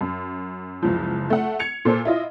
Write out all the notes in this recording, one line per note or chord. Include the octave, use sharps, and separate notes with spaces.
F#2
F#1 C#2 F3
A3 F#5
G#6 C#7 F7
A#2 A4 C5
E4 F4 D#5